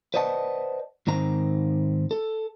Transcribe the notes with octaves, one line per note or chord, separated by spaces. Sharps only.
B4 C5 D5 D#5 F#5 A5
G#2 D#3 C4 A#5
A4